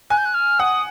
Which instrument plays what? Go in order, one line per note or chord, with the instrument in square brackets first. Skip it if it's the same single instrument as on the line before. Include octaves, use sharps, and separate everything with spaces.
[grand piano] G#5 [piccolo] F#6
[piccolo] G6
F#6
F6
[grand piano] F#5 [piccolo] D#6